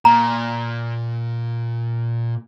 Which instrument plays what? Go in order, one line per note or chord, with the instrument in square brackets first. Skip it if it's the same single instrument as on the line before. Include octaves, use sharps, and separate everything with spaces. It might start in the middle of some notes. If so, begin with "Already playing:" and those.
[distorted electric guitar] A#2 [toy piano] A#5